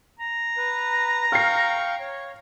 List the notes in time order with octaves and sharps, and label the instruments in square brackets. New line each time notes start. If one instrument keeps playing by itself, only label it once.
[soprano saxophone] A#5
[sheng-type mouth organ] B4
[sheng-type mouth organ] F5 G5 C#6 [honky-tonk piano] F6 C7
[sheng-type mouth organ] C#5